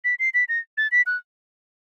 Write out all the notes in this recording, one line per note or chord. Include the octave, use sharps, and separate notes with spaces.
B6
C7
B6
A#6
A6
B6
F#6